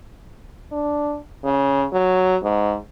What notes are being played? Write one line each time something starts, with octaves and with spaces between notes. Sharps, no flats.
D4
C#3
F#3
G#2